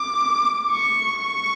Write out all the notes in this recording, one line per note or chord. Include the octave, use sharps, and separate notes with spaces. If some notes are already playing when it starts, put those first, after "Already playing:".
Already playing: D6
C#6
C#6